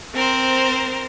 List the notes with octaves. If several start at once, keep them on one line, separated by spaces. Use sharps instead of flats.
C4 A#4 C5